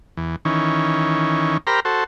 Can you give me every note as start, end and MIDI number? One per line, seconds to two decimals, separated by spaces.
0.17 0.36 40
0.45 1.57 51
0.45 1.57 52
0.45 1.57 61
1.67 1.80 67
1.67 1.80 70
1.67 1.80 72
1.67 1.80 82
1.67 1.80 83
1.67 1.80 89
1.85 2.04 66
1.85 2.04 69
1.85 2.04 72